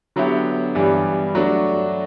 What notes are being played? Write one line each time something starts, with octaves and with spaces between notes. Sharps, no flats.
D3 F#3 B3 E4 G4
G2 E3 G3 B3 D4
F#3 A3 D4 F#4